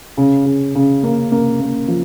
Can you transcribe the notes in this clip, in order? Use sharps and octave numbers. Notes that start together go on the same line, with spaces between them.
C#3
C#3
C#3
A#3
A#3
A#3
F3